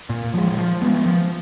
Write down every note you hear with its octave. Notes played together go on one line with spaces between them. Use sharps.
A#2
F3 G#3
F3
G#3 B3
F3